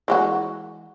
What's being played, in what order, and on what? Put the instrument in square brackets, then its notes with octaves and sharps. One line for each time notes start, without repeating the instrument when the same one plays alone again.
[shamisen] E3 G#3 F#4